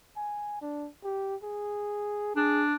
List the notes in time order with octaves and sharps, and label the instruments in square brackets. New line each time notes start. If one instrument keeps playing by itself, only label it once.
[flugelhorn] G#5
D4
G4
G#4
[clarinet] D4 [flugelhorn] G#4